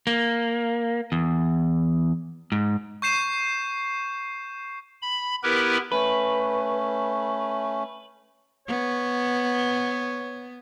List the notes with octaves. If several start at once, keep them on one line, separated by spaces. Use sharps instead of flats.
A#3
E2
G#2
C#6 G6 C7 E7
B5
B3 E4 G4 A#4 B4
A3 C#4 B4
B3 C#5